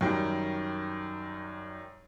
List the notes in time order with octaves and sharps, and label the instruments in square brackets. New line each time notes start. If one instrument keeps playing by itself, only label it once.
[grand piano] F#2 D#3 G3